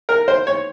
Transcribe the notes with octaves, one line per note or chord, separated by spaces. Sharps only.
A#4
C5
C#5